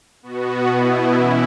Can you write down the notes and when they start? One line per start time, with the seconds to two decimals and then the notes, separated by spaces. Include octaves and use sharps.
0.23 B2 B3 F#4
0.69 B2 B3 E4
1.14 E3 C#4 E4